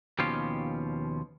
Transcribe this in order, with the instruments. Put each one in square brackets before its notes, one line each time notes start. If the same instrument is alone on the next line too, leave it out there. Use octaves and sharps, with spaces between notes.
[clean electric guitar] D#2 B2 F3 C#4 F4 G4